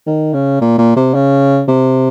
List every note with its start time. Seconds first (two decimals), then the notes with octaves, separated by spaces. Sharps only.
0.07 D#3
0.34 C#3
0.62 A#2
0.78 A#2
0.97 C3
1.14 C#3
1.68 C3